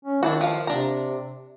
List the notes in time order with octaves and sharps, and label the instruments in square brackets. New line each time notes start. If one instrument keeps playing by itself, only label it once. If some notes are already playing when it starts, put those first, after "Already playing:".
[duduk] C#4
[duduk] D#3 [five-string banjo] D4 E4 F#4
[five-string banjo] F3 F5
[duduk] C3 [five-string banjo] D4 A#5